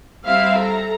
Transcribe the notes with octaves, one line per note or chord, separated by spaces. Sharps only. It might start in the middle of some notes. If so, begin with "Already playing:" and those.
G3 C4 E4 E5 F5
A4 A#5